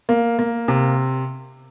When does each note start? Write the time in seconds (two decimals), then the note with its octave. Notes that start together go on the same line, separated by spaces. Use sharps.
0.09 A#3
0.39 A#3
0.68 C3